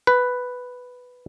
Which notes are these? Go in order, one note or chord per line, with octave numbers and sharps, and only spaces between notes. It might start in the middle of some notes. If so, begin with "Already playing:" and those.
B4